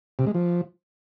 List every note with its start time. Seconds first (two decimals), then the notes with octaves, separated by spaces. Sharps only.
0.19 C3
0.27 G#3
0.34 F3